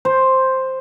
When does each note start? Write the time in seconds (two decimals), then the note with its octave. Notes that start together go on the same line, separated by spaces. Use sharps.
0.05 C5